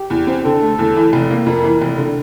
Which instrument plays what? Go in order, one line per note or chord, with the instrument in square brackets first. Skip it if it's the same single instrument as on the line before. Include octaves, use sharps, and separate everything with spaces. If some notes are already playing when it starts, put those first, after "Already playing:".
Already playing: [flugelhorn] G4
[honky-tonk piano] E2
C4
[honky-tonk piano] D3 [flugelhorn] A4
[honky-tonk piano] A3
E2
E3
F1
A#3
[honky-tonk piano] F2 [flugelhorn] A#4
[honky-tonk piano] E3
F1
D3